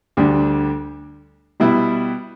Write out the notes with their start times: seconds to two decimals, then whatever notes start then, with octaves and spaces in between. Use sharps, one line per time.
0.17 D2 D3 G3 D4
1.60 B2 G3 B3 E4